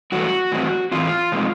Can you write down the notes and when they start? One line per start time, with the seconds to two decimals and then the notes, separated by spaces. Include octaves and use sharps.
0.12 G2 E3 A3 F#4
0.52 A2 E3 G3 C4
0.92 A2 E3 G3 C4 F4
1.32 C3 F3 G#3 C4 D#4